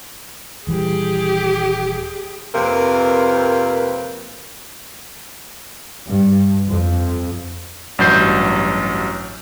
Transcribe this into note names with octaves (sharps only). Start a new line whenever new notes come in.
D#1 E3 G3 G4 G#4
F2 C3 A#3 C4 A#4 B4
G2
F2
A1 G2 F#3 G6 C7